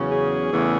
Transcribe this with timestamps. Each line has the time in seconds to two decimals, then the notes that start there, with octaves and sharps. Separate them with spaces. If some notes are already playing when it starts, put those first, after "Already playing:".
Already playing: E2 C#3 F#3 C#4
0.08 G#4
0.51 E2 C#3 E3 A3